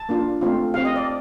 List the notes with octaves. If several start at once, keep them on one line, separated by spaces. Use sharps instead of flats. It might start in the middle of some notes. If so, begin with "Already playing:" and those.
Already playing: A5
A#3 D4 F4
A3 C4 F4
C4 G4 F5
D#5
D5